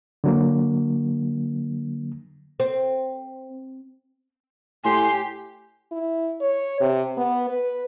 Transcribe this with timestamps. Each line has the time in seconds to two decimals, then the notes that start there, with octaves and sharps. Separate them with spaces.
0.24 D3 F#3 A#3
2.60 C4
4.84 A2 G4 G#5 C6
5.92 E4
6.41 C#5
6.81 C3
7.17 B3
7.49 B4